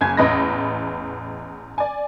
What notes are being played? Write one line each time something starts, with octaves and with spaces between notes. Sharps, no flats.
F#1 F#2 G#5 G#6
A1 E2 B4 D#5 B5 A#6
D5 G#5